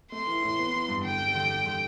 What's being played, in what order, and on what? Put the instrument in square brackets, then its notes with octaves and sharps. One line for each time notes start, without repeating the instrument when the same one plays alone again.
[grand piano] A3 [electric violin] C6
[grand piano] E3
A2
B3
E3
G2
[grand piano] D3 [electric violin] G5
[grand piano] G3
D3
G3
D3